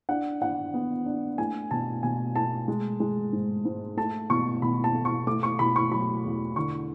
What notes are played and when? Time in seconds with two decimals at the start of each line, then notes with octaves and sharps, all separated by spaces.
0.09 D4 F#5
0.41 D4 F#5
0.74 B3
1.06 D4
1.38 A3 G#5
1.71 B2 A5
2.03 B2 G#5
2.36 A3 A5
2.68 G#3
3.00 G#3
3.33 G#2
3.65 G#2
3.97 A3 A5
4.30 B2 C#6
4.62 B2 B5
4.84 A5
4.95 A3
5.05 C#6
5.27 A3 D6
5.43 C#6
5.59 B2 B5
5.76 C#6
5.91 F#3 B5
6.24 E2
6.56 D3 C#6